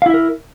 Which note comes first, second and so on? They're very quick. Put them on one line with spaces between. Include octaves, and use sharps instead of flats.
F5 E4 E5 A#4